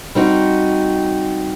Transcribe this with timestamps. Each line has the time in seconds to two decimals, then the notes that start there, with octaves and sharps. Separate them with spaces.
0.15 G3 C4 D#4 F#4